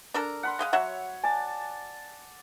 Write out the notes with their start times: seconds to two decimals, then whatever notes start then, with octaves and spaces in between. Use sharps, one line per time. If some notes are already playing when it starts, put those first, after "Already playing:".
0.14 D4 A4 A#4
0.43 F#5 B5 C6
0.59 G#3 D#5 F5
0.73 F#3 C#5 E5 F#5
1.24 D5 G#5 A5